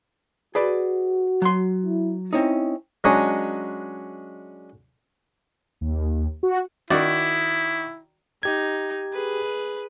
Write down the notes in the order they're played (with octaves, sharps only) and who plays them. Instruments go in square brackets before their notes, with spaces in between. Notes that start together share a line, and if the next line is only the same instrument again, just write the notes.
[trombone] F#4 [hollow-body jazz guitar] G#4 B4 D5
[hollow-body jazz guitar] F#3 C6
[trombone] E4
[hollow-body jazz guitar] C4 C#4 D#4 [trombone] E4
[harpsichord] F#3 G#3 C#4 D4 C#5 D#5
[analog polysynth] D#2
F#4
[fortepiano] D#3 F#4 D5 [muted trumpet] E4
[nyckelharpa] D#4 [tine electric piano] G4 G#6
[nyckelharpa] G#4 B4